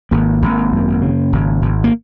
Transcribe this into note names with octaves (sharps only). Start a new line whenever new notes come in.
G#1 A#3
G#1
F#2
C#3
G#1
G#1
A#3